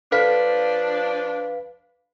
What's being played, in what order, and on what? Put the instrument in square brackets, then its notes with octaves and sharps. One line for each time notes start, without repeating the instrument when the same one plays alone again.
[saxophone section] F3 D4 [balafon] A4 [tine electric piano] B4 F5 B6